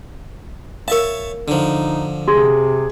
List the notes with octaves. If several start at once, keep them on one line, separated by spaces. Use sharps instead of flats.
A#4 C#5 E5 F5 A5
D3 F3 D#4
C3 G#4 C6